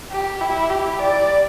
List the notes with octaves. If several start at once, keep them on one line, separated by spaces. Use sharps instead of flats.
G4
E4
G4
D5